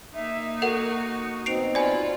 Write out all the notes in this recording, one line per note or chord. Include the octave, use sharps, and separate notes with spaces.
A#3 D#4 E5
F#4 A4 A#4 F#5
B2 C4 D#4 C7 D7 F7
F4 F#4 D5 G#5 B5